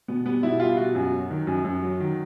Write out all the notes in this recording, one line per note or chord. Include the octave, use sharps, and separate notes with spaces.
B2 B3
G3 B3
B2 E4
G3 F4
B2 F#4
F#2
F#3
D#3
F#2
F#2
F#3
D#3